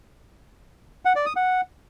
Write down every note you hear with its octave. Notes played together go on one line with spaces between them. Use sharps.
F#5
D5
D#6
F#5